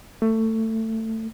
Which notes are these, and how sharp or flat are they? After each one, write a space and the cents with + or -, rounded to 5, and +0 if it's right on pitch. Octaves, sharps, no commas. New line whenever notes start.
A3 +20